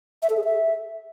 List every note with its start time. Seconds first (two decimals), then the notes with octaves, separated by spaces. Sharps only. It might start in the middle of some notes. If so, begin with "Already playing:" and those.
0.23 E5
0.30 A4
0.37 G#4
0.44 E5